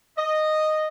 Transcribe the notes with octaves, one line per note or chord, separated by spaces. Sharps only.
D#5